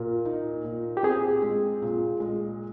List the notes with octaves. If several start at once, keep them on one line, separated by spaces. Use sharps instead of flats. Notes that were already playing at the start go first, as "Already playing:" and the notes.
Already playing: A#2 A#4
D#4
A#2
G4
C4 G#4
G#3
A#2
G#3